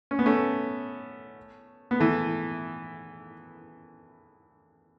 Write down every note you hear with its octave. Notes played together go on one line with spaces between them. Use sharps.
C#4
B3
A3 C#4
B3
E3 A3